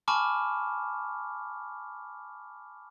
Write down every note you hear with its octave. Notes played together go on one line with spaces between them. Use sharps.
G#5 A5 B5 C#6 D6 F6